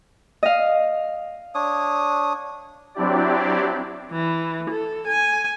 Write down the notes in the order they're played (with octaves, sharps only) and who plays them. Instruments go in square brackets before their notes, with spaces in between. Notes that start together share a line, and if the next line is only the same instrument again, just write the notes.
[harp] D#5 F5
[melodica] D4 C#5 D#6
[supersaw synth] F#3 C4 D4 E4 G4 D5
[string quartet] E3
A4
G#5